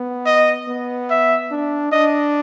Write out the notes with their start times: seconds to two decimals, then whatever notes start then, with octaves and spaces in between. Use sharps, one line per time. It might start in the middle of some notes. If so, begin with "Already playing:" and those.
Already playing: B3
0.26 D#5
0.68 B3
1.10 E5
1.51 D4
1.92 D4 D#5